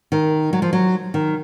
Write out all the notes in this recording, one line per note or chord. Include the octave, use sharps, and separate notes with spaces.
D#3
F#3
F3
F#3
D#3